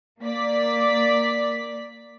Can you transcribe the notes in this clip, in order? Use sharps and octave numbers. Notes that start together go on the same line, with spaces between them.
A#3 D5 B6